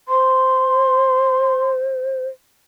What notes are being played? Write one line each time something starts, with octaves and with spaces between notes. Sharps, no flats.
C5 C6